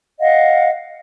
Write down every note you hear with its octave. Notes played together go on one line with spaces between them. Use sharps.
D#5 F5 F#5